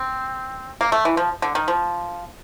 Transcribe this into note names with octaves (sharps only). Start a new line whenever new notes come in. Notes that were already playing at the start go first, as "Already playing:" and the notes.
Already playing: C4
A#3
A3
E3
F3
D3
D#3
F3